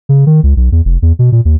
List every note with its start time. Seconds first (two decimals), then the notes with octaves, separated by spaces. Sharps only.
0.09 C#3
0.26 D#3
0.43 C#2
0.57 B1
0.72 E2
0.85 F1
1.02 E2
1.19 B2
1.32 A#2
1.45 D#2